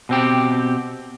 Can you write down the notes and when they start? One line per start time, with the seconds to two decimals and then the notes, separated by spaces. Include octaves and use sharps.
0.09 B2 C4 G4